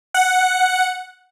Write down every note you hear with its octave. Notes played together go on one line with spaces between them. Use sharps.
F#5